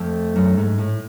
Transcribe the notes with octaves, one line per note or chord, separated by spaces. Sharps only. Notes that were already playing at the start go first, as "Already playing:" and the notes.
Already playing: F2 A3
F#2
G#2
A2